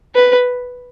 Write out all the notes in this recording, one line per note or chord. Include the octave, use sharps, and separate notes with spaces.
B4